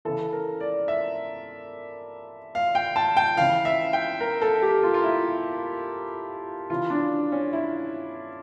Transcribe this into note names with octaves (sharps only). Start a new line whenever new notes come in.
C#3 E3 A4
A#4
D5
E5
F5
G5
A5
G5
C#3 E3 F5
E5
G5
A#4
A4
G4
F4
F4
E4
C#3 E3 F4
D4
C#4
E4